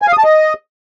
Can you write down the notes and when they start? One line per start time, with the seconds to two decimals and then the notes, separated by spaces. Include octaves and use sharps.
0.02 G#5
0.07 F5
0.13 D#6
0.18 A5
0.24 D#5